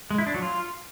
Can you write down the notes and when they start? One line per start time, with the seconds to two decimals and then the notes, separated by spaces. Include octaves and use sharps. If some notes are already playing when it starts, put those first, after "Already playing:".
0.11 G#3
0.18 E4
0.26 D4
0.34 F#3
0.42 F4